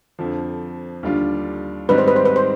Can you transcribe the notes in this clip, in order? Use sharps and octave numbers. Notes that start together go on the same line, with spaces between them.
F2 D3 F3
D#2 D3 G3 D4 F4
G#2 D#3 G3 C4 D#4 B4
C5
B4
C5
B4
C5